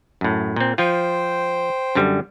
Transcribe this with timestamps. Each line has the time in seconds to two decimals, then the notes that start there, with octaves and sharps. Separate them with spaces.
0.21 F#2 A2
0.56 A#2 C4
0.78 F3 F4 C5 G5
1.95 F#2 D3 G3